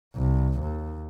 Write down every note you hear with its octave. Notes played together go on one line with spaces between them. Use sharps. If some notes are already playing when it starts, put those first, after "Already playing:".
C2
D#2